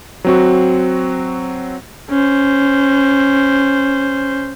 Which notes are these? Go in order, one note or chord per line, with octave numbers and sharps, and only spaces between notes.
F#3 C4 F#4
C#4 C5